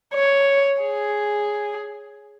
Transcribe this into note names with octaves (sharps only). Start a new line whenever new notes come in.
C#5
G#4